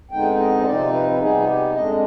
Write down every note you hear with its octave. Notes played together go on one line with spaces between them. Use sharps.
F2 D3 G#3 B3 D#4 G5
D#5
C5
C3 F3 C4 D#4 D5
B4
B4
C3 G3 B3 D#4 G#4
F4
G4
F2 D3 G#3 D4 D#5